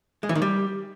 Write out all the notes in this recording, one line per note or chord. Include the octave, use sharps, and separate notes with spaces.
G#3
E3
D#3
G3